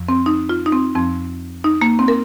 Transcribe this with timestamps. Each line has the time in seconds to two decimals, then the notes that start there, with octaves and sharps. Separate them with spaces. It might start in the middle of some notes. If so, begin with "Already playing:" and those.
Already playing: F2 F3
0.09 C4
0.26 D#4
0.49 F4
0.66 D#4
0.72 C4
0.95 F2 F3 C4
1.64 D#4
1.81 A#3
1.99 C4
2.08 A#4